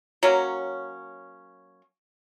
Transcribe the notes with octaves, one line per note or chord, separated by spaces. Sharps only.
F#3 A#3 C#4